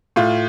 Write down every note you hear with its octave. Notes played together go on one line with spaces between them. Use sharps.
A2 F4